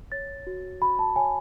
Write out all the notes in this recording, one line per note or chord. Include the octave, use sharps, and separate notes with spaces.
C#5 A6
F#4
F#4 B5
A5
C#5 G#5